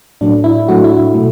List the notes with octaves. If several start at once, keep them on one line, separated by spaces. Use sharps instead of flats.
A2 F#3 A3 D4
E4
A2 F#3 A3 F#4
E4
B2 A3